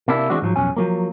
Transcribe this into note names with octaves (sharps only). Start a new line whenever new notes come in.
C3 A#3 D4 E4
E3 G#3 C4 D4 F#4
G#2 F3 F#3
B1 F2 C#4 G#5
F3 F#3 A#3